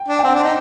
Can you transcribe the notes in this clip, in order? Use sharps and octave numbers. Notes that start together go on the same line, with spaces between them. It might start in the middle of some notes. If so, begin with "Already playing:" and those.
Already playing: G5
D4
G5
C4 F#5
D4
D#4